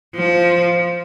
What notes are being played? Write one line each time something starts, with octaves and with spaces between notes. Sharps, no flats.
F3